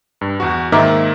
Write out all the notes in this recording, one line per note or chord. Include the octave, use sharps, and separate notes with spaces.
G2
E2 F#4
G#2 D#3 A#3 A#4 E5 D6